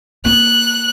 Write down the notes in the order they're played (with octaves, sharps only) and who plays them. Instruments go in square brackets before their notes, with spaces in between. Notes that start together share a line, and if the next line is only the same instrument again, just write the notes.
[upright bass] A#3 [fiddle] F#6